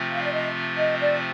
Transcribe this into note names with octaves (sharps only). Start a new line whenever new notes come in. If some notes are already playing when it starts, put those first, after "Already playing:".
Already playing: C3 F3 A3 C4 F4
F5
D5
D#5
D#5
D5